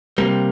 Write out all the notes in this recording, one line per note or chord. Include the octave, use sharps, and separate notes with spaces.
C3 G3 A#3